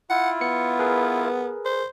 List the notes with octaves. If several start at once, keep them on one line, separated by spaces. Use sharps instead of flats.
E4 F4 F#5
B3 C#7
G#4 A#4 B4
C5